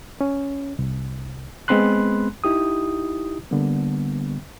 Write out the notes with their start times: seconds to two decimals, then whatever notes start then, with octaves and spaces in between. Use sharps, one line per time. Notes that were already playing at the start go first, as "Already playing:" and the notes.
0.21 C#4
0.79 C2
1.68 G#3 B3 C4 B5 C6 F#6
2.44 D#4 E4 G4 D#6
3.51 D3 G3 A#3 B3